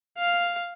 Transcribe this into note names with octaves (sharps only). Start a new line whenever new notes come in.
F5